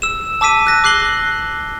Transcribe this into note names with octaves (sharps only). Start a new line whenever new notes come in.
E6 E7
A5 D6 E6 B6 D#7
F#6 A#6
D6 F#6 C7 F#7 G7